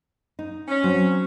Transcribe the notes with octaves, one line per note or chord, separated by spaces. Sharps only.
D#4
C#4
F#3 C4